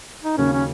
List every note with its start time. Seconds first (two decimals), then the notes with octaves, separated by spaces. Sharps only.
0.24 D#4
0.37 D#2 C#3 F#3 A#3 C#4
0.53 C#4